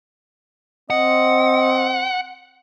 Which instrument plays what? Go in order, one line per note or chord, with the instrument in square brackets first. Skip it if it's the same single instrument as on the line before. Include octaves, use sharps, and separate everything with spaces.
[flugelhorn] C4 [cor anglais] D#5 [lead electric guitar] F#5